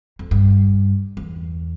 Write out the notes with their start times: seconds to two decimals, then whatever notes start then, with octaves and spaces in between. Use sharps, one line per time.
0.19 F2
0.31 G2
1.17 E2